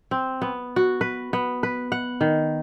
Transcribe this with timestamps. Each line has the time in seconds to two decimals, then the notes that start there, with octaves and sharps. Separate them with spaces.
0.11 C4
0.42 B3
0.76 F#4
1.01 B4
1.33 B3
1.63 B4
1.92 F#5
2.21 D#3